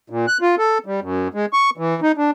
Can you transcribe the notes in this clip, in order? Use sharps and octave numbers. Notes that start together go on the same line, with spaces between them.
A#2
F#6
F4
A4
G3
F#2
G#3
C#6
E3
D#4
D4